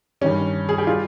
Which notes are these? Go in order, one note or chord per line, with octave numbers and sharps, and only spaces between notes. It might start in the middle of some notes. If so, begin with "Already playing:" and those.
G2 D#3 G3 C#4
G#4
G4
G3 F4